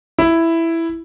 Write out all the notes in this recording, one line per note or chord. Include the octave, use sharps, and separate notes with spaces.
E4